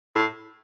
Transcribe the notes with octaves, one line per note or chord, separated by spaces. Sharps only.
A2